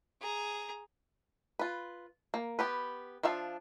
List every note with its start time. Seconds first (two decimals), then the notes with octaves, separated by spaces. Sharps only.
0.21 G#4 A#5
1.59 F4 B4
2.34 A#3
2.59 B3 G4 B4
3.23 F3 D4 E5 F5